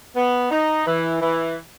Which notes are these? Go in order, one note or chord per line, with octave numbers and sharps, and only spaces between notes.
B3
D#4
E3
E3